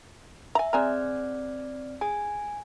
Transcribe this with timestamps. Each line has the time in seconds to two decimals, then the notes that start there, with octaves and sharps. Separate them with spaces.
0.55 E5 G#5 A#5
0.73 G#3 C4 D5 G#5 A#5 F6
2.01 G#4 G#5